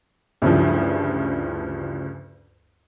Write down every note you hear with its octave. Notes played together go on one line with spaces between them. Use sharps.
D2 G2 C#3 E3 F3